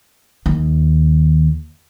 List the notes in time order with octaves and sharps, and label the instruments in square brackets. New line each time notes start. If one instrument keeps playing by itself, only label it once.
[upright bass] D#2